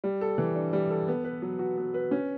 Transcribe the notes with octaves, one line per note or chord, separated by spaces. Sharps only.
G3
A4
E3
D4
G3
A4
B3
B4
F#3
F#4
B3
B4
C#4